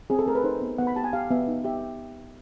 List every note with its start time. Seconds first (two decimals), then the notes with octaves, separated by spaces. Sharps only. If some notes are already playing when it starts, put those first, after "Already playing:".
0.10 C4 G#4
0.19 A4
0.26 A3 A#4
0.35 B4
0.44 D#4 C5
0.62 B3
0.78 B3 F#5
0.87 B5
0.96 G4 A5
1.04 G#5
1.13 G4 F5
1.31 B3 E5
1.48 D#4
1.64 G4 E5